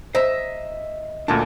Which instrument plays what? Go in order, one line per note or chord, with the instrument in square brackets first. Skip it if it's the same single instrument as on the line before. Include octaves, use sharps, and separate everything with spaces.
[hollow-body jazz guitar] C5 A#5 [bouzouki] D#5 E5
[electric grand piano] D2 A#2 A5 [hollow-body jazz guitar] C#4 D4